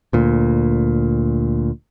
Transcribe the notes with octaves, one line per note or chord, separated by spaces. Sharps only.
D2 A#2